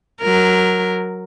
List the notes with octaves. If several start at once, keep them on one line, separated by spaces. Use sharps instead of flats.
F#3 A#4